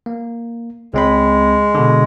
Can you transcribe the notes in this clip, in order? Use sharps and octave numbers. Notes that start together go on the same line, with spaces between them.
A#3
C#2 G#3 C4 B5
B2 D3